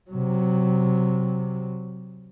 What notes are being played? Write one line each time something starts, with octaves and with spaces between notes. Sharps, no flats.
C3 F#3